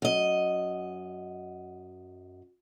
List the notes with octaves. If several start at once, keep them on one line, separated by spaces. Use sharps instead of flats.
F#2 D#5